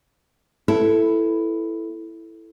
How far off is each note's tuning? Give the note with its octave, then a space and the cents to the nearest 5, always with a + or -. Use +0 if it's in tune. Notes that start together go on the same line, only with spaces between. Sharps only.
B3 +0 E4 +5 A4 +0